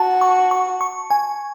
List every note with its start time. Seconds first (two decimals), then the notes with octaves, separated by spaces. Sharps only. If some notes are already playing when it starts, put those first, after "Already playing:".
Already playing: F#4 A5
0.21 C#6
0.51 C#6
0.81 C#6
1.10 G#5